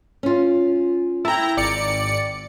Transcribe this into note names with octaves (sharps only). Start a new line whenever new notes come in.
C#4 F4
E4 G5 A5 A#5
G#1 D5 C#7